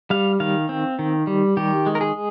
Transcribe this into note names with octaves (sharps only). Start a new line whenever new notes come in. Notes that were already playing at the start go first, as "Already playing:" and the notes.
G3 F5
D#3 F5
C4
D#3
G3
D#3 G4
G#3
A#4
G#4